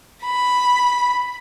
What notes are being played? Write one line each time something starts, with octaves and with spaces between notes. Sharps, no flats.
B5